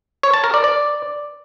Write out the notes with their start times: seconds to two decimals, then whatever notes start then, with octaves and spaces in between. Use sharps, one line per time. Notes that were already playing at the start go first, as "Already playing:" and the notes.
0.23 C#5
0.34 A5
0.44 A#4
0.54 D5
0.64 D5